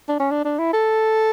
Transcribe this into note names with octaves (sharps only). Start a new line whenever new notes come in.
D4
C#4
D4
D4
E4
A4